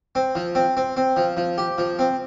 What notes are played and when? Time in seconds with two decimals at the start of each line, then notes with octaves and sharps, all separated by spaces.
0.15 C4
0.35 F3
0.55 C4
0.77 C4
0.97 C4
1.16 F3
1.37 F3
1.58 G4
1.78 F3
1.99 C4